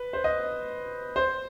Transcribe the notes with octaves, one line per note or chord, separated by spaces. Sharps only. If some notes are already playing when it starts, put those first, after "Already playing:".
Already playing: B4
C5
D#5
C5